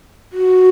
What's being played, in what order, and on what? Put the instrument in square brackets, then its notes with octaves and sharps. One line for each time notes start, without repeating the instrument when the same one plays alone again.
[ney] F#4